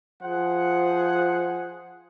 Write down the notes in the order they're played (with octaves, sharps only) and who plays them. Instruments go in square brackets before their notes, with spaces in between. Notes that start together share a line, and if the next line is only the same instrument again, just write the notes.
[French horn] F3 [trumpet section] G#4 C5 F#5